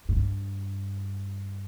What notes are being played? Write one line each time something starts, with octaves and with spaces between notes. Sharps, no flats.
G#2
G2